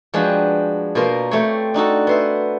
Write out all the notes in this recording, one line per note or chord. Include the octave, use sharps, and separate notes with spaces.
F3 G#3 D4 F#4 B4 G5
B2 A#3 F4 A#4 C5
A3 C4 G4 C5 C#5
D4 D#4 F#4 A4
B3 C5 E5